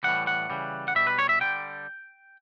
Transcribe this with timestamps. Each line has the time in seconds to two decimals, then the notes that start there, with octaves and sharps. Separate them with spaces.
0.04 A2 E3 G3 F#5
0.27 F#5
0.50 C#3 E3 G3
0.88 F#5
0.95 B2 G3 E5
1.07 B4
1.19 C#5
1.29 E5
1.41 D3 G3 G5